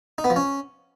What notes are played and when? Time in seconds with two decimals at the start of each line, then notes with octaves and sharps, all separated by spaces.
0.18 D#4
0.24 B3
0.30 F3
0.36 C#4